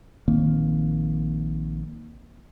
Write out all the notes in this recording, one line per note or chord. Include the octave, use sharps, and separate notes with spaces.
A#1 D#3 A#3 C4